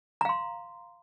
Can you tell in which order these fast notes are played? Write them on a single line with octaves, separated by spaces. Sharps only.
A#5 F5 C6